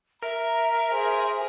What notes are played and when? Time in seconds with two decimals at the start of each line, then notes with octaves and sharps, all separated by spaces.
0.23 A#4 E5 A#5
0.92 G#4 C5